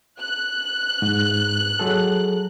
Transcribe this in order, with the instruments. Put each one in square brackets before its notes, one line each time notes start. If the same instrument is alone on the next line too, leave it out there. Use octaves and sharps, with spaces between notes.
[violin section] F#6
[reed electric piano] G#2
F#3 G#4 A4